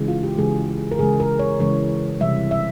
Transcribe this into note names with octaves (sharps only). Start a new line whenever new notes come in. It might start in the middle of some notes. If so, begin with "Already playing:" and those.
Already playing: C#3 E3 G#3
F4
G4
C#3 E3 G#3 G#4
A#4
C#3 E3 G#3 G#4
A#4
C#5
C#3 E3 G#3 C#5
C3 E3 G3 E5
E5